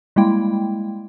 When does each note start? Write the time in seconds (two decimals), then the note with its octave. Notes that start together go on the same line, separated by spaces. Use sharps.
0.16 G3 G#3 A#3 E4 G5